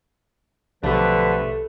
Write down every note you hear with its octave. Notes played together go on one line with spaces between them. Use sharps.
B1 B2 D3 F3 A3 G4 B4